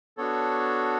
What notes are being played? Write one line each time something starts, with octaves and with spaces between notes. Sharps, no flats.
B3 D4 F#4 A4 C#5